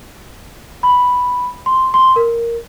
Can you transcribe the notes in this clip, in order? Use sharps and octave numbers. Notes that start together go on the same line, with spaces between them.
B5
C6
C6
A#4